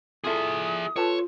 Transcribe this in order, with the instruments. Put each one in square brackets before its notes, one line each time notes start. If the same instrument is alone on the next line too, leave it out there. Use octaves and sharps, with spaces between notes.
[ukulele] E4 F4 A4 [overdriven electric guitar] G#4 E5 [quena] D#6
[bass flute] F4 [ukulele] A4 B4 A5 [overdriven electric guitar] C#5